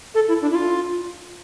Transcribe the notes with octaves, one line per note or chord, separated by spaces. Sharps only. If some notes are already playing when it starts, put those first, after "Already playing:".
A4
E4
D4
E4
F4